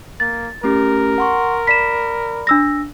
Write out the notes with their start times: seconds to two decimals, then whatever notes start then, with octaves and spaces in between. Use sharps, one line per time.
0.20 A#3 A6
0.64 A3 C#4 G4 A#4
1.18 F#5 C6 C#6
1.67 D5 B5 B6 E7
2.47 D4 E6 A#6